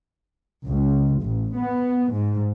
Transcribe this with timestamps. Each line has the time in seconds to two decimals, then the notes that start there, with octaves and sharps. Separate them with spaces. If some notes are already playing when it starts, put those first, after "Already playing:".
0.67 C#2
1.22 A1
1.58 B3
2.12 G#2